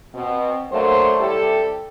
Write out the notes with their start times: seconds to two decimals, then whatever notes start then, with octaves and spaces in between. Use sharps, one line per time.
0.15 B2 C4
0.72 F#3 A3 A#3 D4 C5
1.20 C3 G3 E4 G4 A4